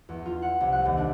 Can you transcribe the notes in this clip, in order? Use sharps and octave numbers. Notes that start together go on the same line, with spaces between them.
E2
F4
F#5
C2
F#6
D#2
D4